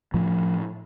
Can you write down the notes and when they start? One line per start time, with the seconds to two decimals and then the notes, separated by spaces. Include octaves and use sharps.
0.14 A2 F3